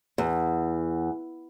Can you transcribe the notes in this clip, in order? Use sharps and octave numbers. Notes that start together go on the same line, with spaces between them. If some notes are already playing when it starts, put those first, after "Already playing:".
E2